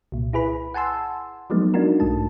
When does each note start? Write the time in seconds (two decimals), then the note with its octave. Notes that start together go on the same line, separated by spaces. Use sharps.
0.12 C2 A#2
0.33 E4 G#4 B4 B5
0.74 F#5 G#5 A5 C6 E6
1.50 F3 F#3 G#3 A3 B3 D#4
1.74 D4 D#4 F4 F#4 A#4
2.00 B1 G#2 A3 A5